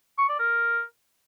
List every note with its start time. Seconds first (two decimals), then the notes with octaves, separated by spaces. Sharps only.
0.18 C#6
0.29 D5
0.39 A#4